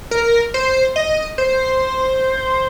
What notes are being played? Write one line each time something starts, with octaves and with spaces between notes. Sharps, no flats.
A#4
C5
D#5
C5